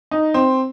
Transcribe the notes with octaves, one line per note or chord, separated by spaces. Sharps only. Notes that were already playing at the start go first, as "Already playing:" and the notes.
D#4
C4